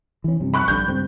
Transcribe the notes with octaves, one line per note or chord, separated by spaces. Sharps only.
E3 C#4
G2 C3 F3
B5 C#6 F#6
A#1 G2 D3 G6
C#2 G2 C4